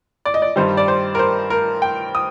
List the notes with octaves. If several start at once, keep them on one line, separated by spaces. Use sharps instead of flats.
D5
D#5
D5
G2 D#3 G3 C5
D5
C5
A#4
C5
A#4
G5
D#6